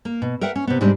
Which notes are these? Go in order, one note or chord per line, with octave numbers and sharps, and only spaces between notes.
A#3
B2
A#4 B4 E5 F#5 G5
C#4
C3 B3
G#2 C3 G3 G#3 C4 D4